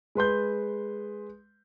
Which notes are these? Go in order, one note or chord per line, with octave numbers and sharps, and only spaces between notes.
G#3 B4 C6 G6